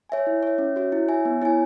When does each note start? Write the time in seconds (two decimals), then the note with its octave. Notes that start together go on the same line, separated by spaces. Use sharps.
0.09 C#5 E5 G#5
0.27 E4
0.43 C#5 E5
0.58 C#4
0.76 F#4 C#5 E5
0.92 E4
1.08 C#5 E5 G#5
1.25 B3
1.42 E4 C#5 G#5